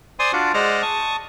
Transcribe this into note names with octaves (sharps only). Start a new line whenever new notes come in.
C5 D5 G#5 C6 D#6
D4 F4 F#4 D5
G#3 C5 D5 D#5 F#5 F6
A5 C#6 D#6